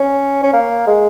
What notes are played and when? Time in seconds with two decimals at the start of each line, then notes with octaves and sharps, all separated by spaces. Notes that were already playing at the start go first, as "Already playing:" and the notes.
Already playing: C#4
0.43 C#4
0.53 A#3
0.87 G#3